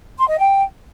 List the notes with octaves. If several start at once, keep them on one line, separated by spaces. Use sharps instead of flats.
C6
D#5
G5